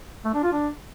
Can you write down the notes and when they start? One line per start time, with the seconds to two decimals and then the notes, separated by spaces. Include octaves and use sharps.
0.25 A3
0.34 D4
0.43 F4
0.52 D4